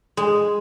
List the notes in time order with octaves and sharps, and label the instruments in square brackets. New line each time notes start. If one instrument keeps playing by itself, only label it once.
[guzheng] G#3